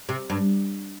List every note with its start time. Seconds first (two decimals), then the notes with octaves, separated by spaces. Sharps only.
0.09 C3
0.30 G2